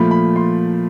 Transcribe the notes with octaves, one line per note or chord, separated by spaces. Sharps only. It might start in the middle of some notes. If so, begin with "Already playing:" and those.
Already playing: A#2 F3 A3 B5
B5
C6